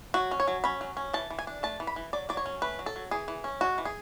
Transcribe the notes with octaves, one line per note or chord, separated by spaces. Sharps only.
F#3 F#4
C#4
C#5
F#3
C#4 B5
F#3
C#4
E3 A5
E3
G#5
D4
A3 A5
E3
B5
E3
F#3 D5
F#3 D5
C#5
C#4
A3 B4
F#3
A4
F#3
E3 G#4
E3
C#4
G#3 F#4
E3
G#4